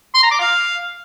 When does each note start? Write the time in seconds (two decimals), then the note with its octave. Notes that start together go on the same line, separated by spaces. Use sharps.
0.15 C6
0.23 A#5
0.31 D6
0.40 F5